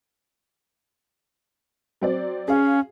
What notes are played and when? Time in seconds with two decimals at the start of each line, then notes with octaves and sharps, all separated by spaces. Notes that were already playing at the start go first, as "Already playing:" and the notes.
2.01 F#3 C4 D5
2.48 C#4 G#4 F5